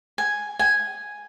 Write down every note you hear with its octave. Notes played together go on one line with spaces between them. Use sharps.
G#5
G#5